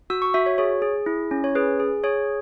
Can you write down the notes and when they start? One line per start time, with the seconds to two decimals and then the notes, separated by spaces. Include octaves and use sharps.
0.10 F#4 E6
0.22 C#6
0.34 F#4 E5
0.46 C#5
0.58 G#4 C#5
0.82 G#4
1.06 E4
1.31 C#4
1.44 C#5
1.55 G#4 B4
1.80 G#4
2.04 G#4 C#5